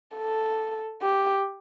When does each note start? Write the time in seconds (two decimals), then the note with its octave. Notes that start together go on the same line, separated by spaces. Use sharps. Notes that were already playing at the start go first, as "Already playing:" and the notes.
0.16 A4
1.02 G4